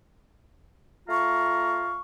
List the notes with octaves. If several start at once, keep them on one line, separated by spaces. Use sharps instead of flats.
A3 F4 F5 A#5 C#6